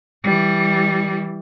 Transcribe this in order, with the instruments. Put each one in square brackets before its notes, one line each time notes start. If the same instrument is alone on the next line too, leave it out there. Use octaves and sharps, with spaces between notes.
[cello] E3 G3